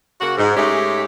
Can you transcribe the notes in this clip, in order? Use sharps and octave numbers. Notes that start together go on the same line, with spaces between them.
C#3 A#3 F#4
G#2
G#2 G#3 A3 C#4 G4